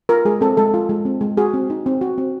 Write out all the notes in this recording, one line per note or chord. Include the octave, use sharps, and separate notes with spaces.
F4 A#4
G#3 G#4
C4 A4
G#3 A4
F4
G#3
C4
G#3
F#4 G#4
C4
D#4
C4
F#4
C4